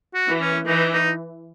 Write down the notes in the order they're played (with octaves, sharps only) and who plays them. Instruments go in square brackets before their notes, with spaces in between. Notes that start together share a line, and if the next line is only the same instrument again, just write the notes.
[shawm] F#4
[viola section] E3
[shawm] C#4
[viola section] E3 [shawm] D#4
[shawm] D#4